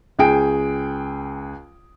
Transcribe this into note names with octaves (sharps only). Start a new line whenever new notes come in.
C#2 G#4 G5 D7